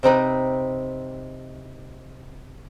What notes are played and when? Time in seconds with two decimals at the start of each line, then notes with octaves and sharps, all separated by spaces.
0.03 C3 C4 D#4 B4